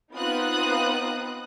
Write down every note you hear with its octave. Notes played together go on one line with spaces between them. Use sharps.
B3 C4 D#4 F4 D#6 F#6